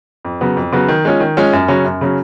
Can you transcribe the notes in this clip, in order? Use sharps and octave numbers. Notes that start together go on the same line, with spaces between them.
F2
C#3 F#3 B3
F2
C#3 F#3 B3
D#3
G#3 C#4 F4
D#3
G#3 C#4 F4
F#2
C#3 F#3 C#4
F#2
C#3 F#3 C#4